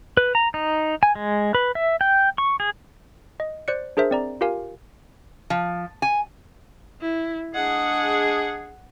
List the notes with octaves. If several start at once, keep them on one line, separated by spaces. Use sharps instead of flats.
B4
A#5
D#4
G#5
G#3
B4
E5
G5
C#6
G#4
D#5
C5 D5 F#6 C#7
D4 G#4 A#4 C5 E5
C4 D5 A#5
F4 G4 A#4 F5 G#5
F3
G#5
E4
G#3 D4 G#4 F#5